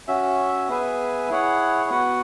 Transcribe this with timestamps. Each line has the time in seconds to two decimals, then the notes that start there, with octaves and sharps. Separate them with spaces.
0.08 C#4 F#4 E5
0.68 B3 G#4 B4 E5 G#5
1.29 E4 G#4 C#5 F#5
1.90 B3 F#4 B4 F#5